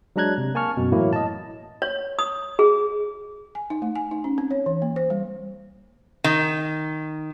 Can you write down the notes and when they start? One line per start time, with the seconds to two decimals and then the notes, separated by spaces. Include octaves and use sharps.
0.16 F#3 G#3 D4 A#5 F#6 G#6
0.38 C3
0.55 A#3 G#5 A5 C#6 F6
0.77 F#2 B2
0.92 A2 E3 F#3 A#3 E4
1.13 D#5 A5
1.82 C#5
2.19 D#6
2.59 G#4
3.55 G#5
3.70 D#4
3.82 A3
3.96 G#5
4.11 D#4
4.24 C#4
4.38 C4
4.51 C#5
4.66 E3
4.82 A#3
4.96 C5
5.10 G3
6.24 D#3